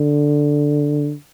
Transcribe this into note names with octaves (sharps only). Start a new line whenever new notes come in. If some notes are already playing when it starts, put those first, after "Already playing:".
Already playing: D3